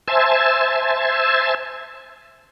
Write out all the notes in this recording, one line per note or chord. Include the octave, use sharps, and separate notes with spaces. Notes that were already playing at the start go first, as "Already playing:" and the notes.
C5 E5 G#5 A5